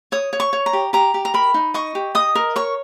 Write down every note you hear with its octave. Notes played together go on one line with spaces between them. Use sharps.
C#5 D#6
C#5
C#6
C#5
A#5
G4
G4 A#5
G4
A#5
A#4 B5
D#4
D#5 C#6
G4
D#5 D#6
A#4
C#5 C#6